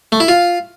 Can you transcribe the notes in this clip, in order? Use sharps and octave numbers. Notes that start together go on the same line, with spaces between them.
A3
E4
F4